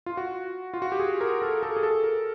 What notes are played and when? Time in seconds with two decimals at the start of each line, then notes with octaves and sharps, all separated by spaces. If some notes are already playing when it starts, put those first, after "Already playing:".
0.06 F4
0.17 F#4
0.74 F4
0.82 F#4
0.92 G4
1.00 G#4
1.21 A#4
1.42 A4
1.63 A4
1.77 G#4
1.83 A4
2.03 A#4